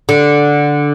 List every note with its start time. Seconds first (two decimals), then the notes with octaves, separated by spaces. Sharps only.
0.09 D3